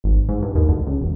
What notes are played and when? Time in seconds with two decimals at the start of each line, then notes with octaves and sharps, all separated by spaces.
0.04 G#1
0.28 G#2
0.42 G2
0.55 D#2
0.69 D2
0.87 C#2
1.01 E1